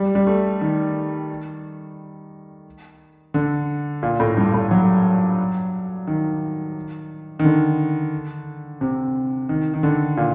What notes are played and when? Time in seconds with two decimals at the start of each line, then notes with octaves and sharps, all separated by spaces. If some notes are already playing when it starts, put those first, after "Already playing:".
Already playing: G3
0.15 G3
0.27 A3
0.61 D#3
3.34 D3
4.03 A#2
4.20 A2
4.37 G2
4.54 A2
4.71 F#3
6.07 D#3
7.39 D#3
7.44 D3
8.81 C3
9.49 D#3
9.74 D#3
9.83 D3
10.17 A#2